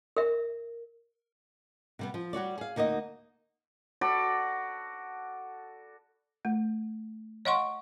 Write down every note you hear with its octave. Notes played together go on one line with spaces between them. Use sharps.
A#4 E5
C3 G3 B3
F3
G3 F#4 C#5 D5
G#4 F5
D2 A#3 D#4 F#4 D#5
F#4 A4 D5 B5
A3
C#5 D#5 F5 F#5 C6 C#6